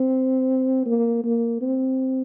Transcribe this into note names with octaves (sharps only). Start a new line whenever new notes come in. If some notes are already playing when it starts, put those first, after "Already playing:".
Already playing: C4
A#3
A#3
C4